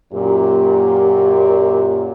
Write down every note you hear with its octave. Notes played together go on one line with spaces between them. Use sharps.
F#2 A#2 G4